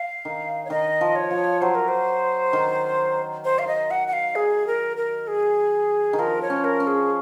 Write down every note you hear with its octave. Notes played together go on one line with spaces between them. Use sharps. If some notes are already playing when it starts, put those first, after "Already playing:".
Already playing: F5
D#3
C#5
D#3 D#5
F3
C#5
F3
F#3 C5
A#4
C5
D#3
C5
F5
D#5
F#5
F#5
F5
G#4
A#4
A#4
G#4
D#3
F3 A#4
C#5
C#4
A#4
C#4
G#4